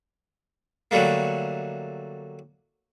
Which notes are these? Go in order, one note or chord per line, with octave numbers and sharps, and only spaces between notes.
D3 F#3 G3 A3 A#3